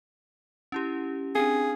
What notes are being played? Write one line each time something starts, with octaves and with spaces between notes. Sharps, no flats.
C#4 E4 G4
C4 D4 G#4